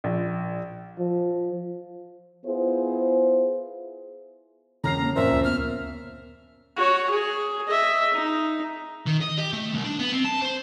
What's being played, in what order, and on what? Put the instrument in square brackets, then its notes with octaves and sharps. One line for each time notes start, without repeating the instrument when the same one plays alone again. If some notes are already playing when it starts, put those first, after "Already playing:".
[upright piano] A#1
[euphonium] F3
[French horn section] B3 E4 F4 G#4 C5
[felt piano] E1 F6 C7 [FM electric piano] C#3 C#4 [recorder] A#5
[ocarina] A#3
[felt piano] F#2 A#2 F3 [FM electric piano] C4 C5 [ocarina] A#4 [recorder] E5
[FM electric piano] D2
[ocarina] B3 [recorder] F6
[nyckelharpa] F#4 C#5
G#4
D#5 E5
D#4
[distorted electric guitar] D#3
D#5
G4
A3
C2
D4
B3
C4
A5
C5